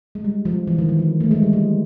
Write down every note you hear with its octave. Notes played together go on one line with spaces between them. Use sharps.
G#3
G3
F3
E3
D#3
D#3
F3
A3
G#3
G3
G3